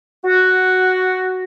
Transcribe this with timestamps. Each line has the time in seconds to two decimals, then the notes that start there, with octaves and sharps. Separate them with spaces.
0.25 F#4